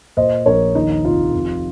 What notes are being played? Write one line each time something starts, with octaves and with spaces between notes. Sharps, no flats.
A#2 C5 D#5
A#1 A#4 C#5
D#2 D#4
F1 F4
F1